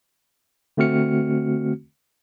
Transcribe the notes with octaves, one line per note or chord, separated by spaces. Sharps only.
D3 A3 C4 F#4 F6 C#7